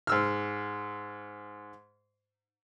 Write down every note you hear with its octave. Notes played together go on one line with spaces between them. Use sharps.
G#2 E6 F6